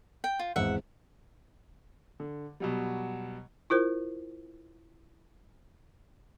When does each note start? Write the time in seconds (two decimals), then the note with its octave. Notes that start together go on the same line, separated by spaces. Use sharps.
0.24 G5
0.39 F4
0.56 G#1 E2 E5 F#5
2.20 D3
2.60 B2 F#3 G3
3.70 E4 F4 A#4 C5